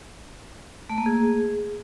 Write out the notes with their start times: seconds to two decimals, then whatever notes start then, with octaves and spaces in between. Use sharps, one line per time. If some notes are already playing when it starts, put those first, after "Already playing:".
0.89 A3
0.98 A#3
1.06 G#4